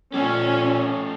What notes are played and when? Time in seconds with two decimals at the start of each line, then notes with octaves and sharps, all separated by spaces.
0.14 A#2 A3 C#4 G4